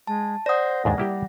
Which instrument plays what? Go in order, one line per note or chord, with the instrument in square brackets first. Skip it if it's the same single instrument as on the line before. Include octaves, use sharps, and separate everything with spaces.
[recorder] G#3 [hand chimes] A5
[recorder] C5 [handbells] D5 D#6 [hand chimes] F#5 A#6
[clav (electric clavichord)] D#2 G#2 D4 [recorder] G#3
[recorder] G3 [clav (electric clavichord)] A#3 E4 G4